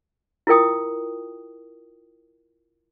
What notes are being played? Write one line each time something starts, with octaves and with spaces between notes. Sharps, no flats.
E4 F4 A#4 G5 D#6